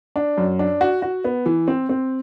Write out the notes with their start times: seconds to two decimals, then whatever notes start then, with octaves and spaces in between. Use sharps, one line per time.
0.16 D4
0.37 F#2
0.59 D4
0.81 F#4
1.02 F#4
1.24 B3
1.46 E3
1.68 C4
1.89 C4